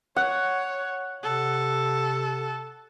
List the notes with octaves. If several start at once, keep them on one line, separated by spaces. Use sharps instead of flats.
C#5 F#5
C3 A4